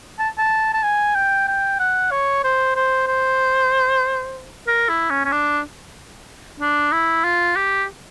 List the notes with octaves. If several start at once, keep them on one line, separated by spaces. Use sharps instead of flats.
A5
A5
A5
G#5
G5
G5
F#5
C#5
C5
C5
C5
A#4
E4
C#4
C#4
D4
D4
E4
F4
G4